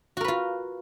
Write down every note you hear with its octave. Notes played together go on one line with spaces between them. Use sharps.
F4 F#4 A#4 B4